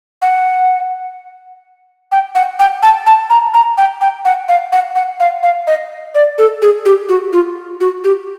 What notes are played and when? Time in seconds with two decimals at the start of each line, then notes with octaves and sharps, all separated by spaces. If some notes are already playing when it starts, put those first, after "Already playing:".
0.22 F#5
2.12 G5
2.35 F#5
2.59 G5
2.83 A5
3.07 A5
3.30 A#5
3.54 A#5
3.78 G5
4.01 G5
4.25 F#5
4.48 F5
4.73 F#5
4.95 F#5
5.20 F5
5.43 F5
5.67 D#5
6.15 D5
6.38 A4
6.62 G#4
6.85 G4
7.09 F#4
7.33 F4
7.81 F#4
8.04 G4